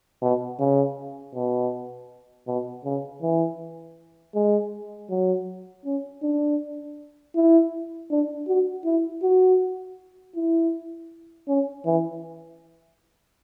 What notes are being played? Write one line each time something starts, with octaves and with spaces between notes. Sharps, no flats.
B2
C#3
B2
B2
C#3
E3
G#3
F#3
C#4
D4
E4
D4
F#4
E4
F#4
E4
C#4
E3